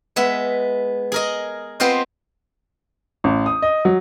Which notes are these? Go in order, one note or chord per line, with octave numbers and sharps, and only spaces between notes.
G#3 B3 E5
G#4 A#4 D#5
B3 C4 F4 C5 D#5
A1
D#6
D#5
F#3